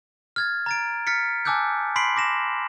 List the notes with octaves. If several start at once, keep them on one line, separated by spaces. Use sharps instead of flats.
F6 G#6 A6
A#5 A6 D7
F6 A6 B6 C#7
G#5 A5 D6 E6 F#6 G6
B5 C6 B6 C7 D7 F#7
D6 A#6 E7